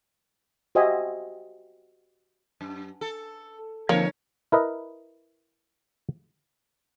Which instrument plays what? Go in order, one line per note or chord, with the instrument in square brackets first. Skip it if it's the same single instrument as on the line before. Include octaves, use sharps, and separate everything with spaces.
[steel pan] F#4 G4 C5 D#5 E5 G#5
[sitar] F#2
A4
[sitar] D3 A#4 C#5 [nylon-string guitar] F3 C4 [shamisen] A#3
[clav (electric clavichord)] E4 A#4 B4 D#5